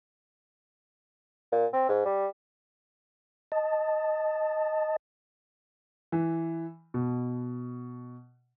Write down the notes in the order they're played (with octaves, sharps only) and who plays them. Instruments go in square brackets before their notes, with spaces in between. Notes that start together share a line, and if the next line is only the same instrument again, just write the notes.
[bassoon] A#2
C4
G#2
G3
[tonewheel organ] D#5 A5
[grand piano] E3
B2